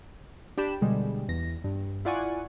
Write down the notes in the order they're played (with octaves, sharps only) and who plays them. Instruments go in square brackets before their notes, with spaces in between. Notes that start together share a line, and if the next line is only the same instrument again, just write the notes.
[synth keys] D4 G4 B5 E7
B2 D3 G3 G#3
E2 A#6
G2
E4 F4 D5 F#5 G#5 C#6